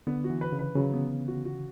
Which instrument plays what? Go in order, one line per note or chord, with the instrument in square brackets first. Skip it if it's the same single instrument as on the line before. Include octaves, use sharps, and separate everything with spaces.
[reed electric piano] D3 [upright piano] B3
[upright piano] F#4
[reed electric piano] E3
[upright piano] B4
[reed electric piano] C#3
[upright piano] B4
[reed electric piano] C#3 [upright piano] F#3
[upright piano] B3
B3
F#4
F#4